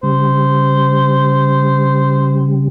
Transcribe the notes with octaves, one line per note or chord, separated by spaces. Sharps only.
C#3 G3 C5